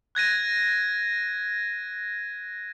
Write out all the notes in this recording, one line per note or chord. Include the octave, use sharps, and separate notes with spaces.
F#6 G#6 A#6 D#7